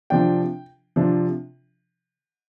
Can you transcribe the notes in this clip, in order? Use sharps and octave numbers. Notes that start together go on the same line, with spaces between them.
C3 F3 D4 G5
C3 F3 D4